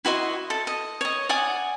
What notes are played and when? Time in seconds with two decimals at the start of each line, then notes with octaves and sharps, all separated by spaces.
0.05 E4 F#4 D#5 C6
0.50 A4
0.67 D#5
1.01 C#5 D#5
1.29 D5 F#5 G#5 D#6